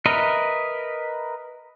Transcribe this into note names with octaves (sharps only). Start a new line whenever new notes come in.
A#4 B4 D#5 E5